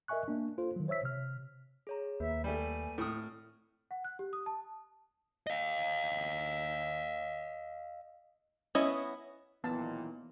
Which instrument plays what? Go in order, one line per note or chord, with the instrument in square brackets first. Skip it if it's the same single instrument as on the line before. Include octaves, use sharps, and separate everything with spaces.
[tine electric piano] A#4 D#5 E5 G#5 C#6 F#6
A#3 D4
F4 A4 C5
D#3 F#3
C5 C#5 E5 E6 B6
C3 F6
[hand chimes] G#4 C#5 A#5
[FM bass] D#2 [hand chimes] A#3 B4 [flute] E5
[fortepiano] G3 A3 [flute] G#5
[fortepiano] A2 D#6 [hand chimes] C4 F6
[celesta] F#5
F#6
G4
D#6
A5
[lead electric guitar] D#5 F5
[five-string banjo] B3 C#4 E4 D#5
[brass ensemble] B1 A#2 D#3 [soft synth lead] E3 [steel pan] B3 F5 A5